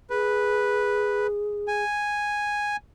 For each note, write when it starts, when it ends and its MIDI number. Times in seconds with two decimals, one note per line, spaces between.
0.10 1.84 68
0.10 1.27 71
1.68 2.76 80